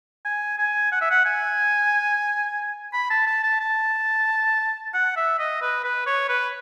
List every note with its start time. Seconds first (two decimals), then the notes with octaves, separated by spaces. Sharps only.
0.25 G#5
0.58 G#5
0.92 F#5
1.01 E5
1.11 F#5
1.25 G#5
2.93 B5
3.10 A5
3.27 A5
3.43 A5
3.60 A5
4.94 F#5
5.16 E5
5.39 D#5
5.62 B4
5.84 B4
6.06 C#5
6.29 B4